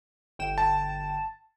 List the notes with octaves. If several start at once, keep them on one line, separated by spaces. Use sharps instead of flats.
G1 G5 E7
A5